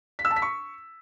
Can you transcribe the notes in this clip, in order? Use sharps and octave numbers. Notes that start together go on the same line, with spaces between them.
B6
E6
A5
B6
C#6